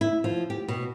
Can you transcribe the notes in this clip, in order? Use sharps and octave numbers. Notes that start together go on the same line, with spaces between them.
E4
F3
G4
B2